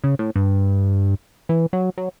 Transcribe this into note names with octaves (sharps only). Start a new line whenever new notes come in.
C#3
A2
G2
E3
F#3
F#3